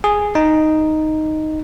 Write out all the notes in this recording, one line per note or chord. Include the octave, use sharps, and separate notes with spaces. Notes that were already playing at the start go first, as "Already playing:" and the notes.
G#4
D#4